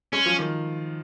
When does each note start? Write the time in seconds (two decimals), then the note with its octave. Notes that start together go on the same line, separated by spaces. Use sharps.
0.13 G#3 C#4
0.26 F3
0.39 D#3